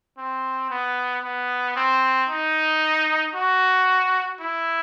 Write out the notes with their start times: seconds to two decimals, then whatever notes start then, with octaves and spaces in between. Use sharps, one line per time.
0.18 C4
0.70 B3
1.24 B3
1.76 C4
2.29 D#4
3.35 F#4
4.41 E4